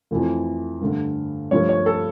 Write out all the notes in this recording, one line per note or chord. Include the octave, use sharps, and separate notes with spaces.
F2 E3 A3
G2 D3 A3
G2 F3 A3 C#5
C#5
A4